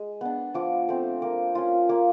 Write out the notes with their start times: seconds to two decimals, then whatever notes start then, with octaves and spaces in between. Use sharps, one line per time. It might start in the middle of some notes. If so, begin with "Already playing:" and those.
Already playing: G#3
0.21 B3 D4
0.54 F3 D6
0.88 A3 C4 D6
1.22 A#3 D6
1.55 C#4 F4
1.89 A#3 D6